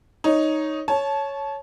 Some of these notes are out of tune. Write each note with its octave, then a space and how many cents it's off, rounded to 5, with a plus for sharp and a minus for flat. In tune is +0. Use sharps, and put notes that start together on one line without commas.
D#4 +0 C#5 +0
C#5 +0 A5 -20